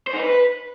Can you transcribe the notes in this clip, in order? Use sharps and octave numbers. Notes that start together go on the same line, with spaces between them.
C5
D#4
B4